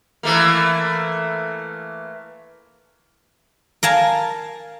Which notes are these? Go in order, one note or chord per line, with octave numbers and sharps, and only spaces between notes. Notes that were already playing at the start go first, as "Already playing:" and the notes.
E3 A3 A#3
A#4 F5 G#5 A5